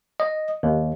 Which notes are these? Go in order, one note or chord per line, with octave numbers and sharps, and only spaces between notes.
D#5
D#2